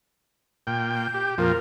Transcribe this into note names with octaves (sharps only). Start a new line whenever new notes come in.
A#2 G5
G6
G4
F2 A#2 F3 A#4